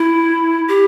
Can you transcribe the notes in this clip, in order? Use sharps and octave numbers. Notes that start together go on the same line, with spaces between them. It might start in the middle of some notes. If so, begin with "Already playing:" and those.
Already playing: E4
G4